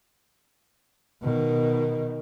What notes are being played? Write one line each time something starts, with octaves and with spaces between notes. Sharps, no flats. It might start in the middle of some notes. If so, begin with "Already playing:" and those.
B2 D#3